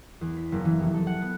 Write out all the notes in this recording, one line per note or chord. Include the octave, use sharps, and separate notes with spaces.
E2
B6
F#1
E3
F1
A4
F#5
B3